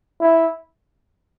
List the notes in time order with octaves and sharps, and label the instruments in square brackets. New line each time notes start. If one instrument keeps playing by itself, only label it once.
[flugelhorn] E4